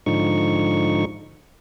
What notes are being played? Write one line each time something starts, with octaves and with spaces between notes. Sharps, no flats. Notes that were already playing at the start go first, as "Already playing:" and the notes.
G#2 D3 F3 D#4 C#6